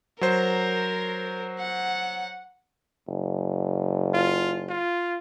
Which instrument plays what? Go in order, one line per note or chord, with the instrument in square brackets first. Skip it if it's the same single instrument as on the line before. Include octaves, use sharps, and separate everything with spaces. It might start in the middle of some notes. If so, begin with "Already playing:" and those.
[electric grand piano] F#3 C5 [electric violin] A#4
[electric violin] F#5
[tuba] F#1
[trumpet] F4
F4